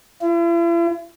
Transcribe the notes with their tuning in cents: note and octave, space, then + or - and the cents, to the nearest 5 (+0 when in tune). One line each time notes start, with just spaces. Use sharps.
E4 +45